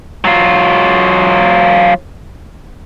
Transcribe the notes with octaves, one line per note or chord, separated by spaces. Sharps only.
F#3 F4